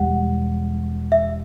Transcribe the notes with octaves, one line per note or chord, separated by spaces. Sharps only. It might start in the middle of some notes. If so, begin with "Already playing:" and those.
Already playing: E1 G3 F#5
E5